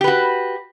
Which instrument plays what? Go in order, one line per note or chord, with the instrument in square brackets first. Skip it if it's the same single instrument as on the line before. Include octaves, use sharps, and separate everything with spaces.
[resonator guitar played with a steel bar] G4
B4
F#4